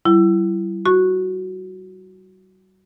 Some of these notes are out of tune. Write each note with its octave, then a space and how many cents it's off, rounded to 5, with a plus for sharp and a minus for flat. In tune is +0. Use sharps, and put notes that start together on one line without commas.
G3 -40 E4 +25
F#4 +0 C#6 -10